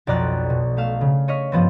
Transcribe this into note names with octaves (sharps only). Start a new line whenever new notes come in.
B1 F2 D5 A#5 F#6 A6
B2
A3 F5 E7
C#3
C#5 D#5 C#6 F6 B6
G2 F3 B3 C4